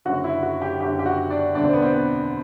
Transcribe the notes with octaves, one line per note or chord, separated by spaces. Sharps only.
F#1 F#2 D3 F#4
E4
F#4
G4
F#1 F#2 D3 G4
G4
F#4
D4
E1 D2 D3 D4
C4
B3
C4
B3